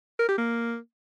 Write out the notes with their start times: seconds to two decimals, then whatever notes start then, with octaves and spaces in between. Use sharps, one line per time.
0.19 A#4
0.29 G4
0.38 A#3